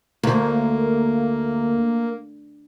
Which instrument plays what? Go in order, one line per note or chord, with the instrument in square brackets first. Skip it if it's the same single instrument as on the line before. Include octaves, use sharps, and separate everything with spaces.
[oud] D2 [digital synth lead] A#3